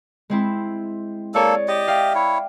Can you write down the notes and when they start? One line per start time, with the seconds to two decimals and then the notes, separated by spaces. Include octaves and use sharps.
0.30 G#3 C4 E4
1.34 A#3 G#4 A4 C#5 D5
1.68 G4 D#5 D6 A6
1.87 E5 F5 G5
2.15 E4 C#5